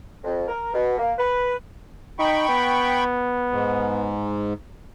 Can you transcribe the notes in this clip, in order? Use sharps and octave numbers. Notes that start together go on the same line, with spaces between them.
F2
A#4
B2
A#3
B4
D#4 G5 B5 C#6
B3
G#2